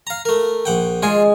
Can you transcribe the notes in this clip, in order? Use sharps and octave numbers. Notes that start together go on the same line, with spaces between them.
F5 A#5
A3 A#4
A#1 F#5 G5
G#3 F4 G#5